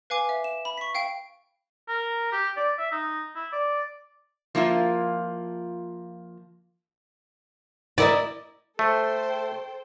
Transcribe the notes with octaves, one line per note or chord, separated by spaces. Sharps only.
B4 F5 G#5 D6
E5
E7
B5
C#6 B6
F5 G5 D7
A#4
G4
D5
E5
D#4
E4
D5
F3 A#3 E4 F4
E4 A#4 D5 D#5
A3 A4 C5 G5